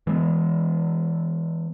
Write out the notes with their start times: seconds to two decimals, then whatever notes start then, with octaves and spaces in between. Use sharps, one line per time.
0.07 E3 G#3 A#3 B3